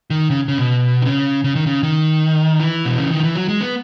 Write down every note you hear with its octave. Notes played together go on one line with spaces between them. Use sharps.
D#3
C#3
C#3
B2
D#3
C#3
C#3
D#3
C#3
D#3
E3
B2
C#3
D#3
E3
F#3
G#3
B3